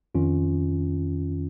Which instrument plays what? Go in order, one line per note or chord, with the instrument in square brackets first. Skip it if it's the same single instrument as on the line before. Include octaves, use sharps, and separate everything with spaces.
[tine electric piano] F2 D#3 C#4 F4